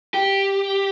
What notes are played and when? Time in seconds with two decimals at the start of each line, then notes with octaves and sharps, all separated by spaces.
0.14 G4